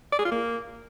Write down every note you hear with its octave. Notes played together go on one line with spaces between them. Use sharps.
D5
G#4
F4
A#3